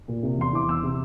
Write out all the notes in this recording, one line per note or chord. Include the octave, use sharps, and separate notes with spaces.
A#2
C3
E2 C6
E3 D6
E2 E6
C3